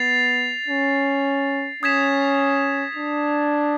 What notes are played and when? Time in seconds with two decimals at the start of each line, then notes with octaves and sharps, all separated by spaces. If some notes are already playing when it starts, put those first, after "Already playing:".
Already playing: B3 A6 C7 F7
0.68 C#4
1.83 C#4 D#6 G#6 B6 E7
2.97 D4